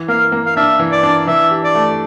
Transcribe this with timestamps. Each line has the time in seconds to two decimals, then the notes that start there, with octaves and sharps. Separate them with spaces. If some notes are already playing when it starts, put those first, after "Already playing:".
Already playing: E3
0.08 A#3 F5
0.32 A#3
0.46 F5
0.57 D4 E5
0.79 E3
0.92 D5
1.03 D4
1.27 E3 E5
1.51 G4
1.64 D5
1.75 A3